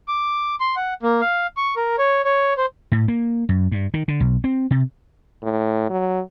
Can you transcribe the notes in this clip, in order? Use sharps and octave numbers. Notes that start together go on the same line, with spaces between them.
D6
C6
F#5
A#3
F5
C#6
A#4
C#5
C#5
C5
A2
A#3
F#2
G2
D#3
D3
B1
C4
C3
A2
F#3